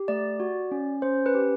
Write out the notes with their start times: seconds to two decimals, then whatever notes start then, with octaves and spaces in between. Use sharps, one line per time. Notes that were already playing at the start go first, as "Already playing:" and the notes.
Already playing: G4
0.08 A3 D5
0.40 F#4
0.71 C#4
1.02 C#4 C5
1.26 B4
1.35 G4